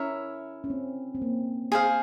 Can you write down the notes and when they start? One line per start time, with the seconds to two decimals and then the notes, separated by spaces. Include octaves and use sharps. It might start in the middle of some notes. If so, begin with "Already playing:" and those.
Already playing: C#4 E4 A#4 C#5 E5
0.64 C#4
0.70 C4
1.15 C4
1.22 A#3
1.72 G#4 C5 F5